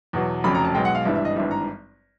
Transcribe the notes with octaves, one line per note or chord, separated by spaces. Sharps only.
E2 B2 F#3
F1 F2 C#3 F#3 B5
A#5
A5
B1 B2 G#3 G5
F#5
F5
G#1 G2 E3 G3 E5
E5
D#5
G#1 G2 E3 G3 E5
A#5